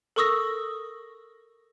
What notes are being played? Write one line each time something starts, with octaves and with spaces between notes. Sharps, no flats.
A4 A#4 C#6 D#6 E6 A#6